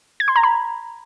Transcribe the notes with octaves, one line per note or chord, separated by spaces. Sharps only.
G#6
C6
A#5
B5